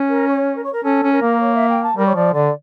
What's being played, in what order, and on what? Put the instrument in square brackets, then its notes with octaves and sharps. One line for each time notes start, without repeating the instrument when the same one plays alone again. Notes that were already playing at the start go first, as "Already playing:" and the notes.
Already playing: [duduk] C#4
[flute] A#4
C#5
A#4
C#5
A#4
[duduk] C#4 [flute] A4
[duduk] C#4
[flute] A#4
[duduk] A#3
[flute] C#5
E5
G5
A5
[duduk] G3 [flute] A#4
[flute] C#5
[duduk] F3 [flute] D5
[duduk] D3 [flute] D5